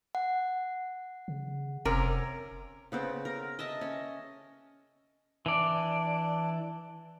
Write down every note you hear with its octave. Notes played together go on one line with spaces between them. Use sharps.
F#5
C#3
F1 C3 C#4 A#4
C#3 B3 C4
A#4
D#5 E5 A5
C#4
E3 D4 D5